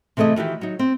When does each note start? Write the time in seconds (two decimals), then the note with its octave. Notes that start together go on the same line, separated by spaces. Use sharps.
0.17 C3 E3 A3 G#4 D#5
0.36 D#3 E3 F#4 G4
0.61 F#3 D#4
0.79 C4